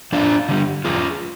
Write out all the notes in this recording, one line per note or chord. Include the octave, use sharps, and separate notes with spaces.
F2 D4 F4
D3 G3
F2 F4 G#4